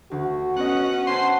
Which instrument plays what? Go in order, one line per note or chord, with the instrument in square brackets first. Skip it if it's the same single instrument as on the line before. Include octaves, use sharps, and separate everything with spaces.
[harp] D2 [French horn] F#4
[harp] B3 D#5 [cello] C#4 [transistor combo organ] F#5
[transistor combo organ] C5 C6 [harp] F#5 G#5 A5